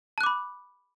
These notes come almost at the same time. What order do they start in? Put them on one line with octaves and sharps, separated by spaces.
A5 F#6 D6 B5